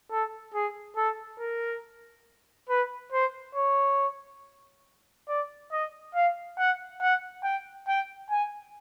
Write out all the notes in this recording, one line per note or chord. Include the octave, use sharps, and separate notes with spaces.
A4
G#4
A4
A#4
B4
C5
C#5
D5
D#5
F5
F#5
F#5
G5
G5
G#5